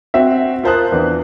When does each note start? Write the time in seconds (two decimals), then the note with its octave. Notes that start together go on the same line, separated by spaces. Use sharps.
0.14 C4 F#4 E5
0.63 F4 A#4 C5 A5 D#6 F#6
0.92 E2 E3 D4